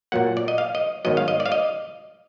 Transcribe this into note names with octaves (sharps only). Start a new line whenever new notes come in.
A#2 F#3 A#3 F#5
D5
D#5
F5
D#5
G#2 D#3 F#3 B3 D#5
F5
D#5
D5
F5
D#5